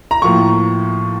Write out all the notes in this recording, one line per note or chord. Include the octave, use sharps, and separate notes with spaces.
A#5
A2 F3 A#3 C#6